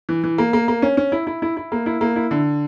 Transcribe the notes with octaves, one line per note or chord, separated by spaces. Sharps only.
E3
E3
A#3
A#3
A#3
C#4
C#4
E4
E4
E4
E4
A#3
E4
A#3
E4
D3